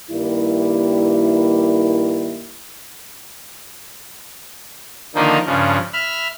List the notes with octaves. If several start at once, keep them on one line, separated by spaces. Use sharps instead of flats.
G2 D#3 G3 A#3 E4
D3 D#3 F3 A#3 D#4
G2 C#3 F3
E5 B5 F6